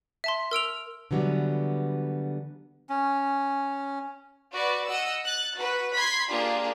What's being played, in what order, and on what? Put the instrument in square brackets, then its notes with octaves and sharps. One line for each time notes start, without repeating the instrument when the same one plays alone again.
[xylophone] E5 A5 C6
A#4 E6 D7 F7
[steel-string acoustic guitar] D3 E3 F#3 G3 B3
[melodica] C#4
[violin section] F#4 B4 D5
D#5 F#5 E6
F#6 A6
F#4 B4
B5 C6 G#6 B6 C7
A#3 D4 F4 G4 G#4